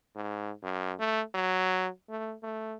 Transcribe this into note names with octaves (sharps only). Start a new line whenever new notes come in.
G#2
F#2
A3
F#3
A3
A3